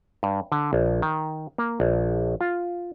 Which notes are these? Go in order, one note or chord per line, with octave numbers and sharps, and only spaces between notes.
G2
D3
A#1
D#3
A#3
A#1
F4